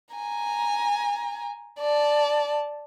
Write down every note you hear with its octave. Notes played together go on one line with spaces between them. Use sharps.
G#5 A#5
D5 A5